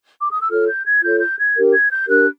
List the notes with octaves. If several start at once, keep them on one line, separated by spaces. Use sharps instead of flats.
D6
D#6
E6
F4 A4 C#5 F6
G6
G#6
F4 A4 C#5 G6
G6
G#6
D4 G4 A#4
G#6
G6
D4 G4 A#4 F#6